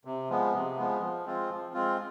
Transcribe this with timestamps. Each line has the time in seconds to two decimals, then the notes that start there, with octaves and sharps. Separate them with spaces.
0.05 C3
0.30 F3 G#3 B3
0.54 C3
0.77 F3 G#3 B3
1.02 F3
1.26 G#3 C4 F4
1.49 F3
1.74 G#3 C4 F4